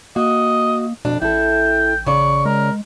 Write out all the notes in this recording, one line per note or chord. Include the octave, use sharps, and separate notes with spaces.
A#3 F#4 D#5
F2 B2 D4
A1 E4 A4 G5
C#3 D5 C#6
G#3 A#4